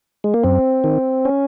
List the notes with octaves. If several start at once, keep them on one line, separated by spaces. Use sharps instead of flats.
G#3
A#3
F#2 C4
D#3
C#4